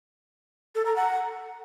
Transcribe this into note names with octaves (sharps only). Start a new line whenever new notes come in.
A4
A#5
F#5